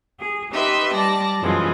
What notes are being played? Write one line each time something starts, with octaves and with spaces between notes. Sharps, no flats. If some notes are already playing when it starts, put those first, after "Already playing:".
G#4
D#4 G4 B4 E5 C6
G3 D5 A5 A#6
F#2 B2 E3 F3 G#3